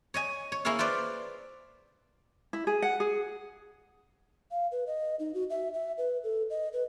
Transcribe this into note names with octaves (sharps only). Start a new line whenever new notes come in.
C#5 D#5 G#5
C#5
A#3 E4 G#4 C#5 F5
F4 B4 C5 D5
E4
G#4
F#5
G#4
F5
B4
D#5
D#4
F#4
E5
E5
B4
A4
D#5
B4